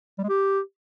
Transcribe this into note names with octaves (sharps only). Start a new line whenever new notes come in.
G3
G#3
G4